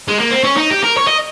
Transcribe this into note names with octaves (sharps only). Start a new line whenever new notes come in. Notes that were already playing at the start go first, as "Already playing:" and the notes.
G#3
A#3
C4
C#4
D#4
G4
A#4
C#5
D#5